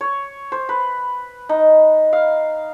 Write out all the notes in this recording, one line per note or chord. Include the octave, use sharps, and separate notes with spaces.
C#5
C5
B4
D#4
F5